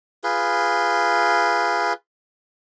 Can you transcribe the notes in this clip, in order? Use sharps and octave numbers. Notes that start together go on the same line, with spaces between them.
F4 G#4 B4